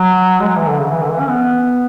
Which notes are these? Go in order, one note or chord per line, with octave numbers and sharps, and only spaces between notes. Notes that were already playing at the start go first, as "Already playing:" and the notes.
Already playing: F#3
G#3
F#3
E3
D3
C#3
E3
D3
E3
C#4
B3